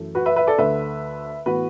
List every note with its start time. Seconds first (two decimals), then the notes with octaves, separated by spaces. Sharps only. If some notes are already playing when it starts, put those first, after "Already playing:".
Already playing: F#2 E3 A3
0.15 F#4 B4
0.26 B4 E5
0.36 B4 E5
0.47 A4 D5
0.58 D2 D3 A3 B4 E5
1.46 A2 E3 B3 F#4 B4